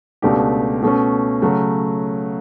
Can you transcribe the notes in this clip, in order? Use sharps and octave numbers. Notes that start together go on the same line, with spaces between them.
C#2 B2 A3 D4 G4
B2 A3 C#4
C#3 F#3 A3